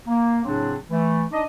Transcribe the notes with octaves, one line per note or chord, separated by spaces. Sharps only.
A#3
A2 C#3 F#3 C4 D4
E3 A3
D4 D#4 D#5